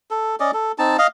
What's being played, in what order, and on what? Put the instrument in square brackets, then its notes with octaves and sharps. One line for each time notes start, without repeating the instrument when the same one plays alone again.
[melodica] A4
C#4 D5 D#5
A4
C4 D#4 A5
D#5 F5